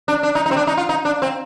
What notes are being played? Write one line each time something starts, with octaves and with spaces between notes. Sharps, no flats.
D4
D4
D#4
D#4
C4
D4
D#4
F4
D#4
D4
C4